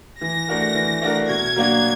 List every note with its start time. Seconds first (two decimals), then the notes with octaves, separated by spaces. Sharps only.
0.21 E3 A#6
0.48 A3 D4 F#4 A#4
0.75 E3
1.02 A3 D4 F#4 A#4
1.29 B2 G#6
1.56 F#3 A#3 D4 F#4